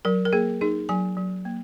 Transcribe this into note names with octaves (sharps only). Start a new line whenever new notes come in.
F#3 A#4
A#4
A#3 G#4
D#4 G#4
F#3 G#5
F#3
A#3